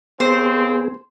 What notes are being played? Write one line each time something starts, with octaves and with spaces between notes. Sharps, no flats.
D#2 B3 C4 G#4 C5